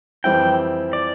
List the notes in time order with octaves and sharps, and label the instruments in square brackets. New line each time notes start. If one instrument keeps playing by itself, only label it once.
[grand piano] F2 E3 G3 C4 E4 [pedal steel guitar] G5
[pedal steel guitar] D5